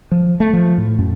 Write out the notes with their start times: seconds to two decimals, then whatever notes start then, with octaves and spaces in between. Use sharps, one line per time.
0.12 F3
0.40 A3
0.53 F3
0.78 A2
0.99 F#2